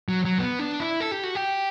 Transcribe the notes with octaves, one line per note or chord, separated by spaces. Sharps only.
F#3
F#3
B3
D4
E4
A4
G4
F#4
G4